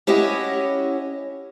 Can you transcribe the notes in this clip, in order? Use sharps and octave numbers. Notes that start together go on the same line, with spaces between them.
C#4 E4 G4 C#5 D#5 F#5